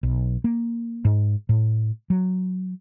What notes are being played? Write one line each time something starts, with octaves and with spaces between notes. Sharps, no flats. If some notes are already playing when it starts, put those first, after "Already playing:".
B1
A#3
G#2
A2
F#3